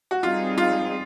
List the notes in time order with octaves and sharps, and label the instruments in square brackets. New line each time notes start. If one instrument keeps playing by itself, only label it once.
[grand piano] F#4
[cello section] G3 C4 D#4 G#4 [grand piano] F4
[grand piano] F4